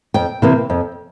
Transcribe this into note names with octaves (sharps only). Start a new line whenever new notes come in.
F2 G5
C3 E3 A#3 E4
F2